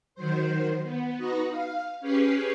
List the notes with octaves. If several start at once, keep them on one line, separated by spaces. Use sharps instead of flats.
D#3 F#3 C5
B3
D#4 F#4 B4 D#5
F5
C#4 G4 G#4 B4 C7